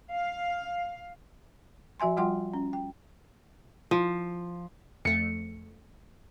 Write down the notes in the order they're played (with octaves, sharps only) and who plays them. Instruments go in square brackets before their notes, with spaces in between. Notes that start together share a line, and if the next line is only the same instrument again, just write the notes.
[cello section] F5
[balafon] F3 F#4 E5 G#5 C6
F3 G3 F4 F#5 G5 C6
C#4
G5
[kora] F3
[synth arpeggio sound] F2 A3 [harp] C#7